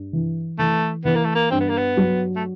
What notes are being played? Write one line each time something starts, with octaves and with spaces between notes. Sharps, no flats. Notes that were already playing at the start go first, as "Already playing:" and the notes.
Already playing: G2
E3
E3 A3
E3 B3
A#3
A3
A#3
G2 C4
B3
A#3
B3
F#3
A3